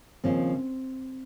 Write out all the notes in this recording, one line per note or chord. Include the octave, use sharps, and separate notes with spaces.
D#2 C#3 F3 C4